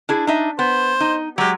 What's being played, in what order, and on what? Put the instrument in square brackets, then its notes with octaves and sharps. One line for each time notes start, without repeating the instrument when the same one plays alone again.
[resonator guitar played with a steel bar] D4 E4 G#4
D4 D#4 E5
[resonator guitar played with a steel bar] B3 [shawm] C5
[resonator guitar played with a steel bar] D#4
[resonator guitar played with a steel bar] F#3 G#3 [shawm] G4